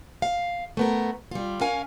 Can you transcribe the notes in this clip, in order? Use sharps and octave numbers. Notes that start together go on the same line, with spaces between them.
F5
A3 B3 A#4
G3 F4
C#4 A#4 F5 G#5